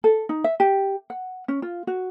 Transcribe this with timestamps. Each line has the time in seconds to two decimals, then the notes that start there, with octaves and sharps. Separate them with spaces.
0.04 A4
0.29 D#4
0.44 E5
0.60 G4
1.10 F#5
1.48 C#4
1.62 F4
1.87 F#4